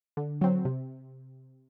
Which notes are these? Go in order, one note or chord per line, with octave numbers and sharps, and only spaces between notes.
D3
F#3 C4
C3